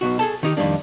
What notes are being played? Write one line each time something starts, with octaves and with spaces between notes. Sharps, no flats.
B1 B2 F#4
G#4 A4 A5
D#3 D#4 G4
F2 D#3 G3 A#3 D4